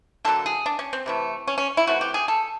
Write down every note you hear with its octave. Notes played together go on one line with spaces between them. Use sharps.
D3 F#3 A#3 A4
G#4
D4
C#4
C4
C3 E3 A3
C#4
C#4
E4
E3 A3 C4 F#4
G4
G#4
A4